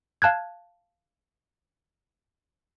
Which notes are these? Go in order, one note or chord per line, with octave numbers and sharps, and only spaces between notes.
F5 A5 F#6 G#6